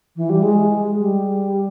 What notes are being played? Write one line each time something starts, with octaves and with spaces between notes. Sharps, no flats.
E3
G3
G#3
G3